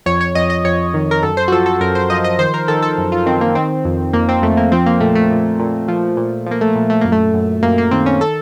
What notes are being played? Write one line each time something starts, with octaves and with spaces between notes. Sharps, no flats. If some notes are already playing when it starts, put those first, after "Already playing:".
F2 C#5
C#5
F2 D#5
D#5
F2 C#5
D#3
A#4
F#2 A4
C5
F#4
F3 A4
A4
F#2 A#4
C5
F3 D#5
D#5
D#3 C5
A#4
D#3 A4
A4
F#2
F4
D#3 C4
A#3
D#3 C4
F2
F2 A#3
C4
F2 A3
A#3
F3 C4
A#3
A#2 A3
A3
A#2
A#2
F3
A#2
F3 A#3
A3
A#2
A3
F#2 A#3
A3
F#2
F#2 A#3
A#3
D#3 C4
C#4
A4